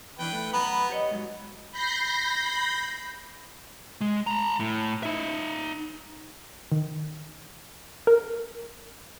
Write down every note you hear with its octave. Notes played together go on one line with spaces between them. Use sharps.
E2 E3 D4 B4 G5
A3
F#2 B3 B4 A#5 B5
G4 C#5 D#5
G#2 F#3
B5 G6 A#6 C7
G#3
A5 A#5
A2
D#4 E5
D#3
A#4